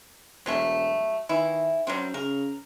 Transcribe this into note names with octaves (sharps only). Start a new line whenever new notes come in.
E1 F#3 G3 A3
D#3 E3 E4
F#2 F#3 G3 C4
C#3 A#4